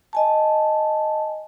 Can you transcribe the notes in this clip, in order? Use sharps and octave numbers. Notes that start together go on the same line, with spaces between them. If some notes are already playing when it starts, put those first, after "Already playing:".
D#5 G#5 A5